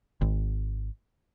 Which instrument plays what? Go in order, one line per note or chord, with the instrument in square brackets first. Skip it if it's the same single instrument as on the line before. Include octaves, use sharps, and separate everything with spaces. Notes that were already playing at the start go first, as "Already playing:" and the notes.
[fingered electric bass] G#1